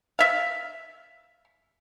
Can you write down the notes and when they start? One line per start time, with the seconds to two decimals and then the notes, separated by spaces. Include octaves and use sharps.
0.19 E5 F5